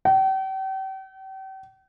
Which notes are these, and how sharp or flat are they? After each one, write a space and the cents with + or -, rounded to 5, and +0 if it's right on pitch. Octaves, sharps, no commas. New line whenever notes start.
G5 -40